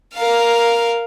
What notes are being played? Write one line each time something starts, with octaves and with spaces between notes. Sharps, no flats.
A#4 F5